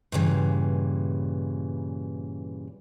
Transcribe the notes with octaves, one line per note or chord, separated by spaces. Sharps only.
G2 A#2 C#3 E3